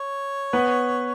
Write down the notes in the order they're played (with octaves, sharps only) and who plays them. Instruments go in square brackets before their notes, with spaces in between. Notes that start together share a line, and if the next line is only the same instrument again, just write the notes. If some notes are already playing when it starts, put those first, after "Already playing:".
Already playing: [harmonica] C#5
[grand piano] B3 B4